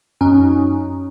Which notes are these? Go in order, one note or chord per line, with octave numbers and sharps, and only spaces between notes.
F#2 C#4 D#4